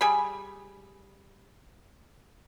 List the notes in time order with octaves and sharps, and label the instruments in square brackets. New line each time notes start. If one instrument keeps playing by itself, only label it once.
[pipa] G3 G#4 B5